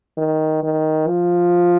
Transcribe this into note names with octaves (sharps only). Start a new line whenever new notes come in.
D#3
D#3
F3